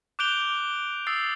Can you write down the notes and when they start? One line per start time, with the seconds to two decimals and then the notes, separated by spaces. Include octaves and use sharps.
0.19 D6 F#6 G6 D7 F7 G7
1.07 D#6 E6 A6 C7